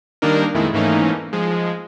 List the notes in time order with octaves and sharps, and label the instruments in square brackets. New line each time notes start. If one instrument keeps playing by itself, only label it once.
[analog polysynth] D#3 G3 A#3 D4 D#4 A#4
F2 A#2 D#3 G#3 A3 E4
G#2 E3 A3 A#3 C#4 D#4
F3 G#3